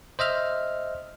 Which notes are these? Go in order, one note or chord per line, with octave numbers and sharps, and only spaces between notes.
C5 D#5 E5 F6